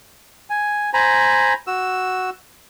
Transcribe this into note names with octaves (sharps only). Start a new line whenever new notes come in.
G#5
C5 G#5 A#5 B5
F#4 E6